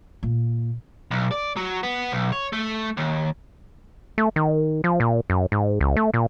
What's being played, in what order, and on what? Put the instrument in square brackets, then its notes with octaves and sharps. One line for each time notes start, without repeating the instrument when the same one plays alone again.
[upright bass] A#2
[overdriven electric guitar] B1
D5
F#3
B3
B1
C#5
A3
D#2
[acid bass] A3
D#3
F3
A#2
F#2
G#2
C#2
A3
A#2